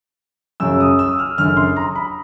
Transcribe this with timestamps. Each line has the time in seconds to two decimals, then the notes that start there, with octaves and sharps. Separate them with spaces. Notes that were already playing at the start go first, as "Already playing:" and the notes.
0.60 F#2 C#3 F#3 E6
0.80 D#6
0.99 E6
1.19 F6
1.38 F#1 F#2 D3 F6
1.57 C6
1.76 A#5
1.96 B5